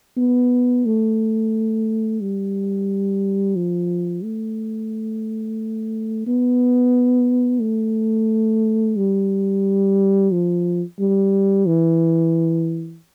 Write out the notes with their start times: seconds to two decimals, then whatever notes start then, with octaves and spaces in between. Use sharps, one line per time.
0.17 B3
0.86 A3
2.21 G3
3.56 F3
4.24 A3
6.27 B3
7.61 A3
8.97 G3
10.32 F3
11.00 G3
11.66 E3